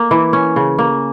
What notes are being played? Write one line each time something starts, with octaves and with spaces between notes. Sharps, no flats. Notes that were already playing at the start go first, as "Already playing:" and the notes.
Already playing: A#3
E3
C#4
C#3
A#3